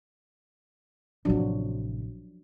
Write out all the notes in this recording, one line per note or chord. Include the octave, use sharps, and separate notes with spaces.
A1 C3 F3 F#3 D4